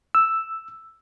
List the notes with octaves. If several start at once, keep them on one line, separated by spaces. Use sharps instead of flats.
E6